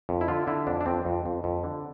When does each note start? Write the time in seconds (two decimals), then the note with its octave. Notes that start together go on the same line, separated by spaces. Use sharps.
0.09 F2
0.21 E4
0.28 D3 F4
0.47 D3 E4
0.67 F2 D4
0.81 D4
0.86 F2 C4
1.05 F2
1.26 F2
1.44 F2
1.64 D3